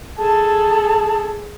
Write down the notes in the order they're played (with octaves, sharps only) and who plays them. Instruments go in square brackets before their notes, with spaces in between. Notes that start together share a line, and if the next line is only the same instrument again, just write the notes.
[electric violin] G#4 A4 [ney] A5